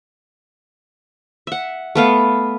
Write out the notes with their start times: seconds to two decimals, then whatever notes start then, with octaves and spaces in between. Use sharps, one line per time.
1.47 E5 F#5
1.95 A3 B3 F5